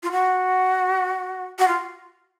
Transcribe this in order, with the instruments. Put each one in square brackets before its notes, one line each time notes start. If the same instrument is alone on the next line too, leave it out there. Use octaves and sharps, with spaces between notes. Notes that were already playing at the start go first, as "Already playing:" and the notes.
[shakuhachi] F4
F#4
F#4
F4